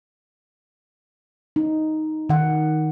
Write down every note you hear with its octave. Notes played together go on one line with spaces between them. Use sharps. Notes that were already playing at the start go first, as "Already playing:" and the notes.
D#4
D#3 F#5